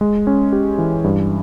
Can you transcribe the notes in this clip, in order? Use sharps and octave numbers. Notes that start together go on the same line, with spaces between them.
G#3
C#4
G4
E3
G2